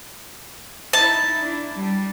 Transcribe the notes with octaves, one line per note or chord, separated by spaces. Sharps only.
D#4 E4 A5
D4 E4
G3 D4